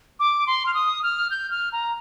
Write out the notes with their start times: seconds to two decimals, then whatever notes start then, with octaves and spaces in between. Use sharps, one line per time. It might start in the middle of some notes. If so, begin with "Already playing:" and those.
0.20 D6
0.47 C6
0.66 F6
0.74 D#6
1.03 F6
1.31 G6
1.50 F6
1.72 A#5